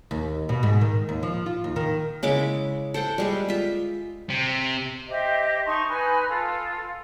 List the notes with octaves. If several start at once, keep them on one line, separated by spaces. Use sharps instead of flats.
D#2
B2
G#2
D#3
D#2
F3
F4
D#2
D#3
C#3 G#3 E4 D6
A4 C5 F#5 G5
G3 G#3 G#4
F4 E5
C3
G4 C5 D#5 E5
D#4 A5 C6 C#6
D#4 B4 G#5
F4 A4